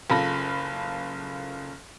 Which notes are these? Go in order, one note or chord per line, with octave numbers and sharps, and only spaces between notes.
F#1 C#3 F4 A4 B5 A#6